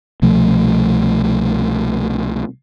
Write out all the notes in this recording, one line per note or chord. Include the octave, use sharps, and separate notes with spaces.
C2 B2 F3 A3